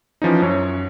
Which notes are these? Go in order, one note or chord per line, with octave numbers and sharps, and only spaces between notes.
E3 F3 C#4 D#4
F#2 F#3 C#5